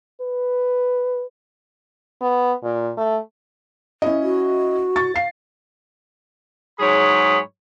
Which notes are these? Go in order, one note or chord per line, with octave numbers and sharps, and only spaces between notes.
B4
B3
A#2
A3
C#4 E4 D#5
F#4
C#6 A6
F5 C7
G#2 F#3 G#4 C#5 B5